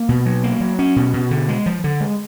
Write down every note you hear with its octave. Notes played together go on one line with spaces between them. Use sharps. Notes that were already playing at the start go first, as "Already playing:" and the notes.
Already playing: A#3
B2
F#3
A#3
F#3
C#4
B2
B2
D3
G#3
F3
D3
G#3